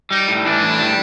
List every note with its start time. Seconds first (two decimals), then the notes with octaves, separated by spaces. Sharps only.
0.11 G3 D#4
0.28 A2
0.45 E3 D4
0.61 A2
0.79 G3